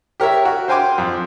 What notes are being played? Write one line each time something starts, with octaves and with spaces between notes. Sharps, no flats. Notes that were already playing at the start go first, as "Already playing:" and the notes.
G4 A#4 C#5 E5
F#4
C5 F5 G5 G#5 C6 D6
F2